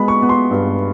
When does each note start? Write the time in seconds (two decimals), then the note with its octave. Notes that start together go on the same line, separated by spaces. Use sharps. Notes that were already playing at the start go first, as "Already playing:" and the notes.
Already playing: G#3 B3 B5
0.08 C#6
0.22 B3
0.29 C6
0.51 G2